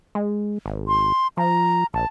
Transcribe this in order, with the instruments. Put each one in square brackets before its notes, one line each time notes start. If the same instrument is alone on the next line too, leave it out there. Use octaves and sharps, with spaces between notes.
[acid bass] G#3
G#1
[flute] C6
[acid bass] F3 [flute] A#5
[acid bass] A#1 [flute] A5